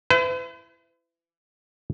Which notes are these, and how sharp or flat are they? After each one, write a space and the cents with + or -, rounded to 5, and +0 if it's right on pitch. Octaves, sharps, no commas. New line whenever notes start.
E4 +20 B4 +45